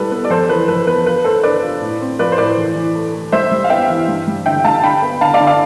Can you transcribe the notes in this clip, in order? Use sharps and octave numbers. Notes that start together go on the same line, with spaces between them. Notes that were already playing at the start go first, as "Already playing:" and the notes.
Already playing: G3 E4 A4 B4
B3
D5
F2 A4 C5
E3 B4
F2 B4
B3 B4
F4 B4
A3 A4 C5
D4 B4 D5
F4
A2
C4
F3 B4 D5
C5
A2 B4 D5
E3
E3
A3
A3
G3 C5 E5
G3
F5
B3 E5 G5
E3
G2
G3
D3 E5 G5
G2 F5 A5
D3 G5 B5
B3
D3 F5 A5
D5 F5
D3
D5 F5